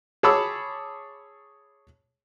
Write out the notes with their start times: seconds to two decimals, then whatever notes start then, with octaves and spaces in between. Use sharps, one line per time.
0.23 G#4 C#5 A5 B5 D6 E6